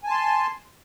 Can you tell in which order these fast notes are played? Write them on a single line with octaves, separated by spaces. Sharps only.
G#5 A5 C6